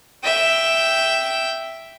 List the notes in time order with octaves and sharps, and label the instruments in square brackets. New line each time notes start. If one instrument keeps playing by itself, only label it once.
[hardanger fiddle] E5 G5